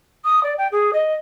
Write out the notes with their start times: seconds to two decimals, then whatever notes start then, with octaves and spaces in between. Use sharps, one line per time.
0.25 D#6
0.43 D5
0.58 G5
0.72 G#4
0.93 D#5